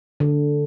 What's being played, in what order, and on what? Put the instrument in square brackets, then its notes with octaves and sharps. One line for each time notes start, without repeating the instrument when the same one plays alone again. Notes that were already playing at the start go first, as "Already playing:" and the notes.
[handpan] D3